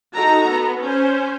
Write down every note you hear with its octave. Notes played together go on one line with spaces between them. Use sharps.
D#4 F#4 A4 A#5
B3
C#4 C5